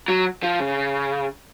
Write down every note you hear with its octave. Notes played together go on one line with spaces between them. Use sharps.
F#3
F3
C#3